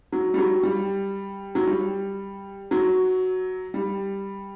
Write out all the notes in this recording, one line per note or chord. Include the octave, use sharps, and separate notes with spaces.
F#3
G3
F#3
G3
F#3
G3
F#3
G3